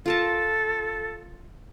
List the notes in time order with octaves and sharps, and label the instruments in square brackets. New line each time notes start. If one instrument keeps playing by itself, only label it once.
[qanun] F4 A#4 A5 [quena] A4